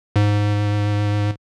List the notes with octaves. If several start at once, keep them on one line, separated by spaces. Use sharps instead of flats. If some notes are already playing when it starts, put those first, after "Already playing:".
G#2